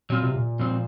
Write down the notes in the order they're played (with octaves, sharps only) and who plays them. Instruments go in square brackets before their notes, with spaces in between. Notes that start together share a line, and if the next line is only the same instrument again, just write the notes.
[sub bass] A#2 [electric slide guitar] F#3 C4 F4
[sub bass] C3
A#2
[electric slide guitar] G#2 F3 C4